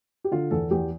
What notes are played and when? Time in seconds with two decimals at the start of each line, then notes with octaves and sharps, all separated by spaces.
0.24 G4
0.31 D3 F4
0.51 E2 A4
0.71 E2 G4